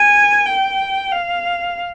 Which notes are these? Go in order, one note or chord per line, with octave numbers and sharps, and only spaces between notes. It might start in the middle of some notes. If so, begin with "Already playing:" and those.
Already playing: G#5
G5
F5